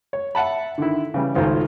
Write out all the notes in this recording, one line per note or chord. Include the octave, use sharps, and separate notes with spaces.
C#5
E5 F#5 A5 B5
D3 D#3 E4
C#3 E3 G3
G#1 C#2 A3 F4 C5 A#5